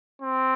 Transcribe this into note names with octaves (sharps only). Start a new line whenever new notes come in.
C4